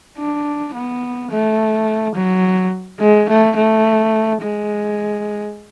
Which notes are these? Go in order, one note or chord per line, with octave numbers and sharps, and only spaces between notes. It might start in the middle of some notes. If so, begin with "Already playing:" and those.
D4
B3
A3
F#3
G#3
A3
A3
G#3